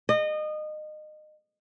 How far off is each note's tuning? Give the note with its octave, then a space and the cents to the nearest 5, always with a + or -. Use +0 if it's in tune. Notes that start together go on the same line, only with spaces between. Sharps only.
D#5 -25